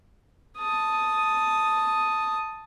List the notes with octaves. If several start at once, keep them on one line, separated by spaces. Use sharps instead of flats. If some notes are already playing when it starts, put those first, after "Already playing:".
A5 D#6